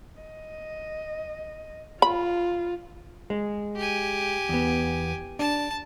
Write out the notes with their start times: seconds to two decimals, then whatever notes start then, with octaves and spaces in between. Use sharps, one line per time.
0.22 D#5
2.02 F4 B5
3.30 G#3
3.76 G4 G#5
4.49 E2 B3
5.39 D4 A5